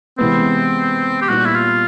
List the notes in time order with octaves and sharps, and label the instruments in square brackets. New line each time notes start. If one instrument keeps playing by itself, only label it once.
[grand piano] C3 E3 G#3 B3 [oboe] C4
[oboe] G4
[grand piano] A#2 G3 B3 D#4 [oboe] F#4
[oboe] E4
F4